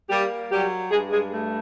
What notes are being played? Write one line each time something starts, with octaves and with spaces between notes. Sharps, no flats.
G3 A#3 G4
F#3 G3 G4
G2 G#3 G#4
G#3 G#4
A3